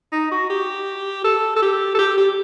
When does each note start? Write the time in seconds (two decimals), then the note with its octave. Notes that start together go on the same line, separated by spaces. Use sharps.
0.12 D#4
0.31 F#4
0.50 G4
1.24 A4
1.56 A4
1.62 G4
1.94 A4
1.99 G4
2.17 G4